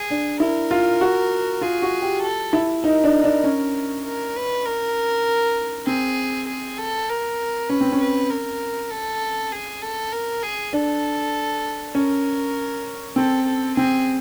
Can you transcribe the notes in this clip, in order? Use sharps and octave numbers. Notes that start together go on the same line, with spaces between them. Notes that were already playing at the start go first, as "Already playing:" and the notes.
Already playing: G#4
D4
E4 A#4
F4
F#4
F4 G#4
F#4
G4
A4
E4
D#4 A#4
D4
D4
C#4
A#4
B4
A#4
C4 G#4
G#4
A4
A#4
C#4 B4
C4
C#4
B4
A#4
A4
G#4
A4
A#4
G#4
D4 A4
C#4 A#4
C4 A4
A4
C4 G#4